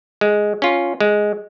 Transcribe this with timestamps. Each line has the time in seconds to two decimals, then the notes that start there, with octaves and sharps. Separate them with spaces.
0.21 G#3
0.62 C#4 F4
1.00 G#3